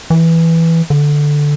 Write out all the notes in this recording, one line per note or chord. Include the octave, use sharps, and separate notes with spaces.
E3
D3